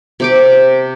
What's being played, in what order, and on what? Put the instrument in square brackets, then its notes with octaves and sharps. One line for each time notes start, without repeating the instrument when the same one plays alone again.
[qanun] C3 G4 D6